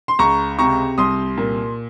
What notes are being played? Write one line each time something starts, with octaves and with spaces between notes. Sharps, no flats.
C6
C#2 A#5 C#6
C3 A#5 C#6
C2 C6 D#6
A#2